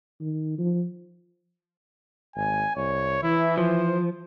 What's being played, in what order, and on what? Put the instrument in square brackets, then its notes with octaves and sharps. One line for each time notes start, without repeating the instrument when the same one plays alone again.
[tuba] D#3
F3
[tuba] G#1 [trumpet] G#5
[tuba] C2 [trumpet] C#5
[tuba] E3 [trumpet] E4
[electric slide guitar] F3 [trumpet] C5